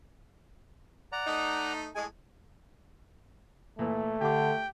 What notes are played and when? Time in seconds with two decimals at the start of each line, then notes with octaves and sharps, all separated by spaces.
1.12 D5 F#5 A#5
1.27 A3 D#4
1.95 A2 G#3 G#5
3.79 A#2 E3 A3
4.21 D3 G4 G5 D6